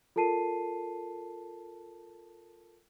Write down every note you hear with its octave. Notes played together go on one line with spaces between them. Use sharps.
F4 A4 A#4 A5 C7 D#7